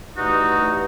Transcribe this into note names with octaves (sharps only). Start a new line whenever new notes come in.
G2 E3 A3 D#4 F#4
G2 E3 A3